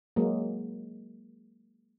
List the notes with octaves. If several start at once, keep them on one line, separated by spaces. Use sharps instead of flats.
F#3 G#3 A#3